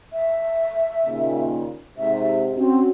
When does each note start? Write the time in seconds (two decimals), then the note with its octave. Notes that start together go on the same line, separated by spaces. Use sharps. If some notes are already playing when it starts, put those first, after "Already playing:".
0.12 E5
1.05 D#2 A#2 C#3
1.98 G#2 C3 E5
2.57 C4 C#4 F#4